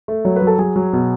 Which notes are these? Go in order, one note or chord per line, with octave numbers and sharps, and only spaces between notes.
A3
F#3 C#5
B4
F#3
A4
F#3 G#4
F#3
B2